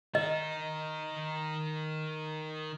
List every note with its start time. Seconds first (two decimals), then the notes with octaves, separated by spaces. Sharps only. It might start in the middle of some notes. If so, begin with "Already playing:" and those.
0.15 D#3 D#4 D#5